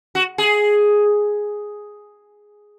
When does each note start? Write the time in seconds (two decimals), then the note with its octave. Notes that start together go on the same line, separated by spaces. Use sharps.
0.15 F#4
0.38 G#4